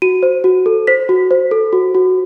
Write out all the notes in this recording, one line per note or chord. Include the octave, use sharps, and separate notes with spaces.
F#4 D#7
C5
F#4
A4
C5 B6
F#4
C5
A4
F#4
F#4